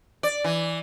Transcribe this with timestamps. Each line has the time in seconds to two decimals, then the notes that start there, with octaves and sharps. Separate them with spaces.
0.23 D5
0.44 E3